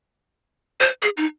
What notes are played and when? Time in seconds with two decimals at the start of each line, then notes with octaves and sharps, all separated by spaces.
0.81 C5
1.03 G#4
1.17 D#4